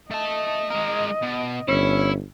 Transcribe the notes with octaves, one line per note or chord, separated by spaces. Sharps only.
A3 D#5 A5
G#3 A#4
B2
G1 C#4 E4